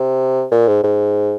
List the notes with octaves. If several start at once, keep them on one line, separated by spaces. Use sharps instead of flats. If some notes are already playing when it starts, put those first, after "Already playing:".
Already playing: C3
A#2
G#2
G#2